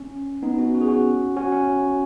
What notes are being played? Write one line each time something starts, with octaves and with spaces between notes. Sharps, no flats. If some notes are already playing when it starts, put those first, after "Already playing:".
Already playing: C#4
B3 D#4
D#4
C#4 F#4
F#4
G#4
C#4 F#4
C#4 F#4
C#4